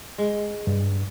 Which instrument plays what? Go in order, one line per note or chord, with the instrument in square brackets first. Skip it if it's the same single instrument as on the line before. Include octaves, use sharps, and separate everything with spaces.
[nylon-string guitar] G#3
[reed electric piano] G2